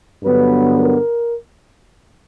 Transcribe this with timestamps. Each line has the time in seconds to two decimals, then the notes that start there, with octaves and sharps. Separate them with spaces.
0.23 G2 D3 F#3 B3 B4
0.77 A#4